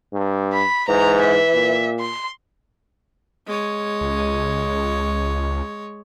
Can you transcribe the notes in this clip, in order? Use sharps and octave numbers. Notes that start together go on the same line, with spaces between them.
G2
B5
G#2 E3 A#5
E5
A#2
C6
G#3 C#5
C#2